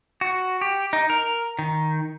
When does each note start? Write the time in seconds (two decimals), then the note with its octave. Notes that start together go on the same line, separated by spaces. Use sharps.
0.21 F#4
0.61 G4
0.93 D#4
1.10 A#4
1.59 D#3